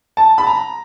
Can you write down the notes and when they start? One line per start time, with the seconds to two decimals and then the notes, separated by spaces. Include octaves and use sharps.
0.17 A5
0.38 B5
0.47 A#5